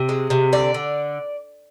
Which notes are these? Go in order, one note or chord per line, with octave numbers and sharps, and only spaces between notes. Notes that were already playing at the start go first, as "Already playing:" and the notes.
Already playing: C3
G#3
C3
D3 D5
D3